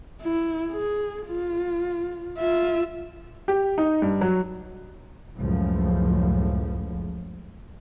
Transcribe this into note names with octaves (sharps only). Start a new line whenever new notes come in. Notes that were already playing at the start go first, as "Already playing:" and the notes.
E4
G#4
F4
F4 E5
G4
D#4
G2
F#3
C#2 F#2 A2 F3